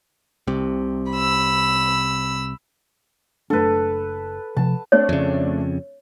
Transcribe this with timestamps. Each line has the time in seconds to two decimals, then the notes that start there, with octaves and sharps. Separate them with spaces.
0.47 C2 C3
1.12 B5 E6
3.50 F#1 A3 D4 A4 B4
4.57 C3 F3 A5
4.92 A3 C4 D4 C#5
5.09 F2 C#3